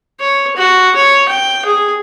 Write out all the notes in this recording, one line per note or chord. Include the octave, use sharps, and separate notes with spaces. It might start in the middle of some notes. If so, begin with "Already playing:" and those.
C#5
F#4
C#5
G5
G#4